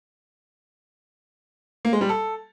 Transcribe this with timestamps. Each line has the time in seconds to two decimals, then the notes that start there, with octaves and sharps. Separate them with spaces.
1.85 A#3
1.93 G#3
2.01 G3
2.09 A4